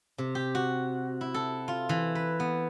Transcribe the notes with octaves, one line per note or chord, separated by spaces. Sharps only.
C3
G4
F#4
E4
A4
F4
E3
B4
B3